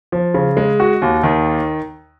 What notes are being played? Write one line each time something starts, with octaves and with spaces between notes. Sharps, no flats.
F3
C#3
G#3
F#4
D#2
D#3